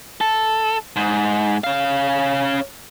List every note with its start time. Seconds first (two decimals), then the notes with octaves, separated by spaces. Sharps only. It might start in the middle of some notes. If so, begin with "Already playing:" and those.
0.21 A4
0.96 G#2
1.64 C#4 F5